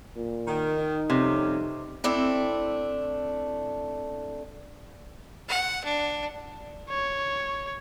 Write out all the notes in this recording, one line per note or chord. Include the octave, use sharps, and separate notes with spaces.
A#2
D#3
D#4
F2 C3 G3 C#4
A3 C4 D4 E4
F#5
D4
C#5